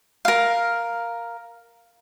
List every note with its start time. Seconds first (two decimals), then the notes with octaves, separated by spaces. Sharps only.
0.25 A#4 F5